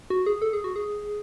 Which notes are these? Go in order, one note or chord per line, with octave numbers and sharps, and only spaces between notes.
F#4
G#4
A4
G#4
F#4
G#4